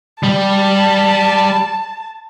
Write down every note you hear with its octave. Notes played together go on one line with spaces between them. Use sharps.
G3 A5